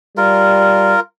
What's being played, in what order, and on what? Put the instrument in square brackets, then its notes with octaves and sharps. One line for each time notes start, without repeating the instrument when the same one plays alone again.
[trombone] G3 [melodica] F4 A#4